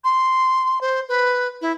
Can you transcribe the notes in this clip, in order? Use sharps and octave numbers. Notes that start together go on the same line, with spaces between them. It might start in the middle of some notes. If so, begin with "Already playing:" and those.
C6
C5
B4
E4